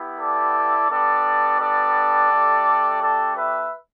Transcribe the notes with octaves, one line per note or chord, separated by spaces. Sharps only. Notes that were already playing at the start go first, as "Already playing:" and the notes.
Already playing: B3 E4 G4
A4 D5
B3 D4 G4 A4 D5
A4 D5
A3 D4 G4
A4 D5
B4 E5